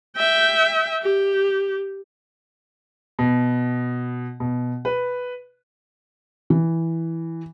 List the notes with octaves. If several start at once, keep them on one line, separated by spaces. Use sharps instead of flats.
E5 G5
G4
B2
B2
B4
E3